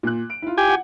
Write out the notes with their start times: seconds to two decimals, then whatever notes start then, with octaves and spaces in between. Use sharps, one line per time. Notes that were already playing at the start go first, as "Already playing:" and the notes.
0.03 A#2 F#6
0.30 D7
0.42 E4 F4
0.57 G4 G#5
0.69 F#5